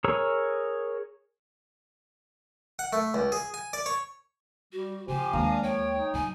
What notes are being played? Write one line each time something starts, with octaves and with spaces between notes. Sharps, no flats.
G#4 A#4 C#5 A#5 E6
F#5
A3
C#2
G#4
G#5
D5
C#5
G3 F#4
C#3 F3 G4 C5 G#5
D#2 G#3 D4 F5 A#5
F3 C#5 G5
D#4
F3 F#3 G#5